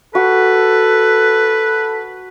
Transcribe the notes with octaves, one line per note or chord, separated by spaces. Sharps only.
F#4 A4 B4